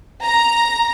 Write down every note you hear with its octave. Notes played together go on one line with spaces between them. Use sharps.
A#5